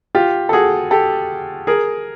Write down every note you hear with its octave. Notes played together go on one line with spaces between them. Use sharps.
F4 G4
A4
F#4 G#4
G4 A4
G#4 A#4